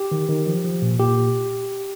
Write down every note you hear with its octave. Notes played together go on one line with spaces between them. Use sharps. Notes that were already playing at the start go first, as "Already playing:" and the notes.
Already playing: G4
D#3
D#3
F3
F3
A#2
A#2 G4